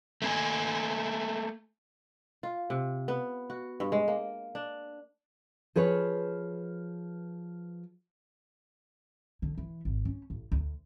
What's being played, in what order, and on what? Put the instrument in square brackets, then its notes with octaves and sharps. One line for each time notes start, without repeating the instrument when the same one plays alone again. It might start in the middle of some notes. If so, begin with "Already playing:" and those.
[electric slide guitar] A3 A#3 G#5
[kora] F4
C3
B3
F#4
G2
G#3
A#3
D4
[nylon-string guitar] F3 G#4 B4 C#5
[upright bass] D3
E3
G#1
C#4
A1
D2